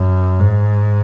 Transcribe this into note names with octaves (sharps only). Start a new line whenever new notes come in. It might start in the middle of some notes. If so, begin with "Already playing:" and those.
Already playing: F#2
G#2